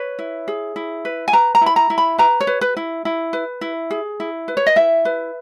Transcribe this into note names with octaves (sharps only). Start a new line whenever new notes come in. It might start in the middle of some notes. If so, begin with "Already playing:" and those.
Already playing: B4 C#5
E4
G#4
E4
B4
G#5
B4 A#5
A#5
E4
B5
A#5
E4
B5
B4 A#5
C#5
B4
B4
E4
E4
B4
E4
G#4
E4
B4
C#5
D#5
E4 E5
B4